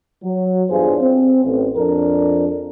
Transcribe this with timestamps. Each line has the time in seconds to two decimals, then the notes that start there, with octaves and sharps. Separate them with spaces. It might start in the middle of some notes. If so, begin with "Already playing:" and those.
0.23 F#3
0.70 E2 G2 D4 F4 G#4 C5
1.01 C4
1.45 A1
1.76 F2 D4 A#4